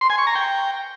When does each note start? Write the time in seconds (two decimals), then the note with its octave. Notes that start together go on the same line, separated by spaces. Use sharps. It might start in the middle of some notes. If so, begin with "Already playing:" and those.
0.01 C6
0.10 G#5
0.18 C#6
0.27 A#5
0.35 G5